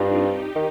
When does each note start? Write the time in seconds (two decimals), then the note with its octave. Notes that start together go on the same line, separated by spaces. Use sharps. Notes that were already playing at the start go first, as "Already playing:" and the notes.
Already playing: G2 C4 D4 D#4 F4
0.25 D#4 G4
0.55 D#3